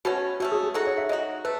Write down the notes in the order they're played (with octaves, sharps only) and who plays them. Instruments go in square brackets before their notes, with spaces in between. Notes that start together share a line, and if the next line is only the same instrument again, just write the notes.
[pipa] B2 A3 C#4 [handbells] F#4
[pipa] B2 A3 C#4 [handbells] F#4
[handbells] G#4
G#4
[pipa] G#3 D#4 F#4 [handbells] A4
[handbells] C#5
E5
[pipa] G#3 D#4 F#4 [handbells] D#5
[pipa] A3 [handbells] B4